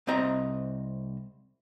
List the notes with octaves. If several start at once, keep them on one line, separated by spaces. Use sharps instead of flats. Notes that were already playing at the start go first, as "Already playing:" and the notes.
C2 C4 D#5 A#5